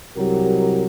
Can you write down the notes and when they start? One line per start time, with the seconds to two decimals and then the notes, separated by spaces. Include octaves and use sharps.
0.17 C2 F#3 G4 A#4